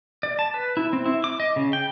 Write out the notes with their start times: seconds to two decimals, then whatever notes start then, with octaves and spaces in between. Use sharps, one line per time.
0.23 D5
0.39 A5
0.54 B4
0.77 E4
0.93 C4
1.06 E4
1.24 D6
1.40 D#5
1.56 C#3
1.73 G5